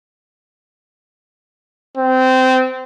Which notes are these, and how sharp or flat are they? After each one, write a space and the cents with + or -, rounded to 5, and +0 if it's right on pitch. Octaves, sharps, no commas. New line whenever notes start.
C4 -20